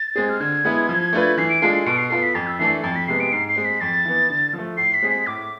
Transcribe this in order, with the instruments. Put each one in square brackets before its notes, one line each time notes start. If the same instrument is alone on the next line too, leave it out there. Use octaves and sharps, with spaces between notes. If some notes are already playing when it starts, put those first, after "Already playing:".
Already playing: [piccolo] A6
[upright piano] G#3 C4 G#4
[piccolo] F6
[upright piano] D3 [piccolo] G#6
[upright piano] G#3 B3 E4 B4
F3
A3 D4 F4 B4
[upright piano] E3 [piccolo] C7
[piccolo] D7
[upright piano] G#3 D4 F4 A4 [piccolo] C7
[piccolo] C7
[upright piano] B2 [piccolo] D7
[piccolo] C7
[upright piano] B3 F4 A4 [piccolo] C7
[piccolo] B6
[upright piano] F2 [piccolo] A6
[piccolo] E6
[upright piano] E3 A3 D4 A4 [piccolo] C7
[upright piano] F2 [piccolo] A6
[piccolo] B6
[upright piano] C3 G#3 B3 [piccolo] C7
[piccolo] D7
[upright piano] G#2 [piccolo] C7
[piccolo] C7
[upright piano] G#3 C4
[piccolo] B6
[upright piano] F2 [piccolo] A6
[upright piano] E3 B3
D3
F3
A3
[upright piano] A2 [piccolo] C7
[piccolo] B6
[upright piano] G#3 C4 G#4
[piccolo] B6
[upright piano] A2 [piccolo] D6